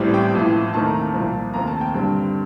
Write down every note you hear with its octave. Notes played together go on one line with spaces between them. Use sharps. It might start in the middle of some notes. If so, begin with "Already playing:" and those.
Already playing: A1 A2 G3 C4
G5
A1 A2 F3
D#2 D#3 A3 C4 A5
A#5
A5
C2 A#2 F3 C4 A5
D#2 D#3 A3 C4 A#5
A5
G5
G2 D3 G3 C4